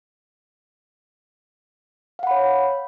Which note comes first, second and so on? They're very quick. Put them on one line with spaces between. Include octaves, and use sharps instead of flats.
F5 F#5 B5 C#5